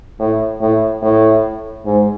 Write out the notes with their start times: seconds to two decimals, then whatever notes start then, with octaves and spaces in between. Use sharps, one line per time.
0.19 A2
0.61 A2
1.03 A2
1.86 G#2